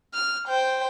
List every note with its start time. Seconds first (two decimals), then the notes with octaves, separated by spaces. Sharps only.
0.14 F6
0.48 C5 G5